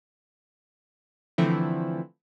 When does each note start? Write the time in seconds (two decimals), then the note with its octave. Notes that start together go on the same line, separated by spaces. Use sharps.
1.38 D3 E3 F3 A3 C4 E4